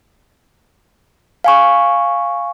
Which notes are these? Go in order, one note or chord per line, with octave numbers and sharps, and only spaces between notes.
F5 G#5 C#6